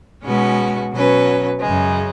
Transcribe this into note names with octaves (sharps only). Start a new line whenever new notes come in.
B2 G#3 C#4 F#4 B4
B2 F#3 C#4 B4
F#2 C#3 G#3